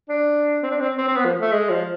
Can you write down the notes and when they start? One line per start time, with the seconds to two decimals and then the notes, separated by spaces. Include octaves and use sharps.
0.09 D4
0.63 C4
0.71 D4
0.80 C4
0.98 C4
1.08 C4
1.17 B3
1.25 F3
1.41 A3
1.52 G#3
1.70 F3